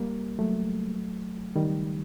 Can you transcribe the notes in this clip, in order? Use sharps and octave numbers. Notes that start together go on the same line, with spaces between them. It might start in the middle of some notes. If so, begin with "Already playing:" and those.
Already playing: G3 A#3
F#3 A3
D#3 G3